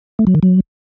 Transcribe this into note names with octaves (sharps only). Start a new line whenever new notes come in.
A3
F#3
D#3
F#3